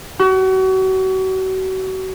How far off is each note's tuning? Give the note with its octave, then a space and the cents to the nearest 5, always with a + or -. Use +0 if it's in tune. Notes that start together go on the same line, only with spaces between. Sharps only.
F#4 +35